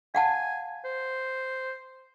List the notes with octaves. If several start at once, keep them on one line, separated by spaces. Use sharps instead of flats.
F5 F#5 G#5 A5
C5